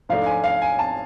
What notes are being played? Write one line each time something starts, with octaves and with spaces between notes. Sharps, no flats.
G#2 F3 A3 D4 F5
G#5
F5
G#5
A5